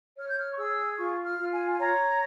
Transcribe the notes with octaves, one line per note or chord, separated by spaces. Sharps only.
C#5 F6
G6
F6
C#6
G#4 E6
F4 C#6
F6
F4
G#5
G#5
C#5 A#5